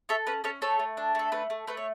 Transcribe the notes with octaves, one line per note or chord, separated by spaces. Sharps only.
A4 C#5 E5
C#4 B4
C#4 A4 C#5
A3 A4 C#5
A3
D4
A3 A4
A3 B4
A3
A3 B4
C#5